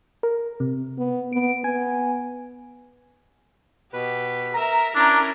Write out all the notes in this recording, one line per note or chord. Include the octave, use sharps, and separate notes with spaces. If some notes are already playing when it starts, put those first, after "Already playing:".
A#4
C3
B3
B3 D7
B3 G#5
B2 G4 B4
A#4 E5 A#5
C#4 D4 E4 A#4